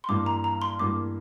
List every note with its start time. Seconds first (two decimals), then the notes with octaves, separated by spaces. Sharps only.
0.04 C6
0.08 G2 E3 A#3 D6
0.26 A#5
0.44 A#5
0.62 C6
0.80 G2 E3 A#3 D6